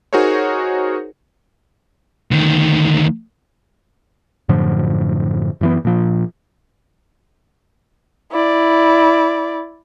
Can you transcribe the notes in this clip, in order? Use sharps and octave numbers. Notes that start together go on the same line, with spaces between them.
D#4 F#4 G#4 A#4 C5 C#5
D2 D#3
F#2 A2 D3 F3
F#2 E3 B3
A#2 F3
E4 D5